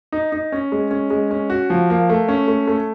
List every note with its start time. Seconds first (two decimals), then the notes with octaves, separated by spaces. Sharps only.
0.12 D#4
0.32 D#4
0.52 C#4
0.72 G#3
0.91 C#4
1.10 G#3
1.31 C#4
1.50 F#4
1.70 F3
1.90 A#3
2.10 A3
2.28 C#4
2.48 A3
2.68 A3